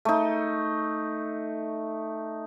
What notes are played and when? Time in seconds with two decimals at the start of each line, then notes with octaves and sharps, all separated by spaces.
0.05 A3 D#4